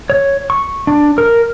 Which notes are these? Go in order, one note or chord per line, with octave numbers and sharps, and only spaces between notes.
C#5
C#6
D4
A#4